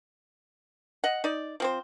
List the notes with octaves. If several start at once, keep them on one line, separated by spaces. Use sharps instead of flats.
D#5 F#5
D#4 D5
F3 C4 C5